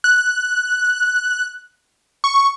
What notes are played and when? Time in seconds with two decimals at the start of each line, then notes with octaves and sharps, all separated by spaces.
0.04 F#6
2.24 C#6